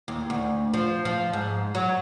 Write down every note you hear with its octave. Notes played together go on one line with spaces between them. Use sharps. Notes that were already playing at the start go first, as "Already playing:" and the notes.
D#2
D2
F3
F3
G#2
F#3